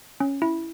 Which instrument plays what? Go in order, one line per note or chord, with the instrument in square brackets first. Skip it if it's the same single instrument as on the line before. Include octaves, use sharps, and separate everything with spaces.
[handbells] C#4
E4